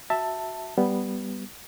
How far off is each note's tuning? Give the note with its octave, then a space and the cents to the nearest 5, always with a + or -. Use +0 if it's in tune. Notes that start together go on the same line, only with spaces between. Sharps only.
F#4 +0 E5 +0 A5 +10
G3 +0 B3 +0